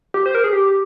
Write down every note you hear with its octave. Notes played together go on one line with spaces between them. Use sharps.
G4
C5
A#4
G#4
G4